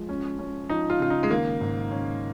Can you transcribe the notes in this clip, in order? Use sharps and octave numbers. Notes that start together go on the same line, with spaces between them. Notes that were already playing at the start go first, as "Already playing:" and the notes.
Already playing: F3 G#3
C#4
C#4
F3 D#4
F4
C#3 F4
D#4
G#3
D#3 A#3
G#2
C#4